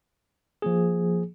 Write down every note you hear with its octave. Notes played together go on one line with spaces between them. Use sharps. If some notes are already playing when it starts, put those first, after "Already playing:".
F3 A#3 G#4